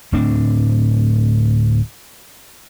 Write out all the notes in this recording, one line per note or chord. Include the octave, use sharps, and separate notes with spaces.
D1 A2 C4 D4